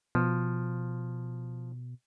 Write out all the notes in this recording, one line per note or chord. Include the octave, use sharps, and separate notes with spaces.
B2 F3